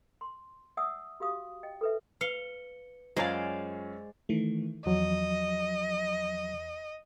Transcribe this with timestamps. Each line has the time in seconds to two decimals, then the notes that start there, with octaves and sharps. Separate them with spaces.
0.21 C6
0.77 D5 E5 F#5 G#5 D#6 E6
1.20 F#4 G4 F5 D#6
1.63 D#5 G5
1.81 A4 B4 E5
2.21 B4 F5 C#7 G7
3.17 F#2 G#3 C#4 F4 C5 D5 F5 G#5
4.29 D#3 E3 A3
4.86 E2 F3 F#3 D#5